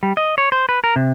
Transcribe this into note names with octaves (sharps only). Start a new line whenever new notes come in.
G3
D#5
C#5
C5
B4
A#4
C3